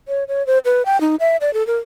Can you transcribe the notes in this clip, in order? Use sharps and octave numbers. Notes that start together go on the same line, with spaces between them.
C#5
C#5
C5
B4
G5
D#4
E5
D5
A4
A#4